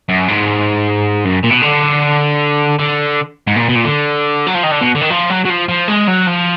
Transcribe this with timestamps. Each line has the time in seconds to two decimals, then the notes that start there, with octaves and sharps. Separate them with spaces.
0.09 F#2
0.28 G#2
1.25 F#2
1.44 A#2
1.51 B2
1.63 D3
2.79 D3
3.47 G#2
3.56 A#2
3.69 B2
3.75 A#2
3.85 D3
4.47 F#3
4.55 F3
4.64 D#3
4.72 D3
4.81 B2
4.95 D3
5.01 D#3
5.10 F3
5.30 F#3
5.45 F#3
5.50 F3
5.68 F3
5.88 G#3
6.08 F#3
6.27 F3